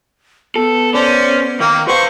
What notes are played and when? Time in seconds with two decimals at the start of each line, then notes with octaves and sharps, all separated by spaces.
0.56 B3 A4
0.94 C#4 C5 D5
1.60 D#3 A#3
1.88 B4 C5 F5 C#6